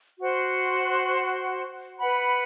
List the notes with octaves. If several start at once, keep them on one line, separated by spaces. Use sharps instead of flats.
F#4 C5 F#5 C6
B4 F#5 B5